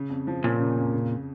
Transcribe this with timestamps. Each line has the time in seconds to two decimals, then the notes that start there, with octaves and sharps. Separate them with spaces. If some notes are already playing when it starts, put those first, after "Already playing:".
Already playing: C#3
0.10 F2
0.27 F3
0.43 A#2 C#4
0.60 C#3
0.77 F2
0.93 C#3